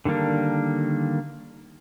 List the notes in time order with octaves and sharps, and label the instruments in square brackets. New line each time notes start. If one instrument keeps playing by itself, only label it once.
[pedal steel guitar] D3 D#3 G3 A#3 D4